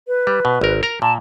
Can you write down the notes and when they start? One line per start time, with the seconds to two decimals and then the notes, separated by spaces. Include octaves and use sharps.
0.08 B4
0.27 G3
0.45 B2
0.61 G#1 A#4
0.83 A#4 A#5
1.02 A#2 A5